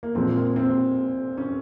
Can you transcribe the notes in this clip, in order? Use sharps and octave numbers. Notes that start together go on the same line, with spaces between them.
A#3
A#2 F3 G#3 C4
A#3
C4
C#4